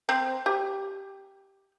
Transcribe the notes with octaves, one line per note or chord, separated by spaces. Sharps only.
C4 C5 A#5
G4